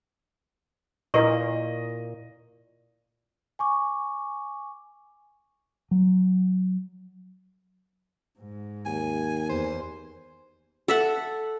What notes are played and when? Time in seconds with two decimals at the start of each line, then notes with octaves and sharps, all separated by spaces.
1.14 A#2 E4 A#4 D#5 C#6
3.59 G#5 C#6 D6
5.91 F#3
8.39 G#2
8.86 D#2 G#5
9.49 E2 C5
10.88 A4 E5 F#5